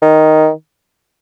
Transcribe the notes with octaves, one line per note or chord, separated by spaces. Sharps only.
D#3